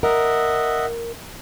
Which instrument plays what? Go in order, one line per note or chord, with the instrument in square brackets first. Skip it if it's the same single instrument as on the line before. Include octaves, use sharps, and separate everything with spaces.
[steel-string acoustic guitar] A#4 [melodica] D#5 E5 F#5